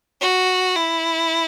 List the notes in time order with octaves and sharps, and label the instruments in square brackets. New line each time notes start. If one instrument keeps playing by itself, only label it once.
[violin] F#4
E4